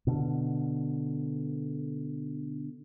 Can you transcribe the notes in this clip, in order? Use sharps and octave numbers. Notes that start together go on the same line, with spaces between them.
B2 D3